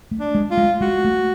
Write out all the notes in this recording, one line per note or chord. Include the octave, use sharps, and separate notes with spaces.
A3
D4
G#3
F4
G#3
G#3 F#4
A3